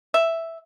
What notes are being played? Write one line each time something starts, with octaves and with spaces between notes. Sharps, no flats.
E5